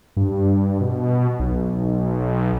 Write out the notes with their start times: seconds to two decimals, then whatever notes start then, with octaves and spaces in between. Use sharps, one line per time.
0.17 G2
0.81 B2
1.40 B1